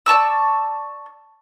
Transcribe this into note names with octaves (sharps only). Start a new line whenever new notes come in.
D5 A5 C#6 E6